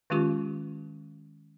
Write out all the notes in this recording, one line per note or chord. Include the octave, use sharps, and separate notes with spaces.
D#3 G#3 C#4 F4 G4 C#6